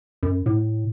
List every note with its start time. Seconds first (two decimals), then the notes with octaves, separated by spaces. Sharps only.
0.23 F#2
0.46 A2